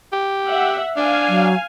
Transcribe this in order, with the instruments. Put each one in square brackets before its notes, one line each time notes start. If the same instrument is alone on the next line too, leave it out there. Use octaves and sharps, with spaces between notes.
[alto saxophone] G4
[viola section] E5 F#5
[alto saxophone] D4 [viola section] F5 G#5
[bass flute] F#3